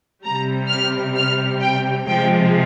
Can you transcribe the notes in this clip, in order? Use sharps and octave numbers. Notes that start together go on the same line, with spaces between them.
C3 G3 A#5
F6
F6
G5
C3 F3 G#3 G5